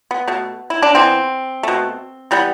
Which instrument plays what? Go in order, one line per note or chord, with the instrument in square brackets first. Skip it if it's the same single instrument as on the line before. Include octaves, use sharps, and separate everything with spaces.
[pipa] B3
B2 A3
E4
D4
E3 B3 C4
B2 A3
E3 G3 B3